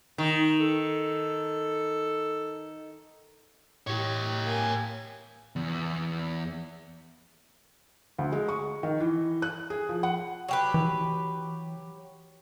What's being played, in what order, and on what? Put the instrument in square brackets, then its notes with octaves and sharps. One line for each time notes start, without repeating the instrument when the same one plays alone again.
[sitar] D#3
[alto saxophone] A4
[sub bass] A2 [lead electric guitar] G4 C#5
[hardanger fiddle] A#3 G#5
[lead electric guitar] E2
[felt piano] D2
G#3
C#6
D#3
E3
F#6
G#4
F3
F#5
[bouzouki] F#3 G4 B4
[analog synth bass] E3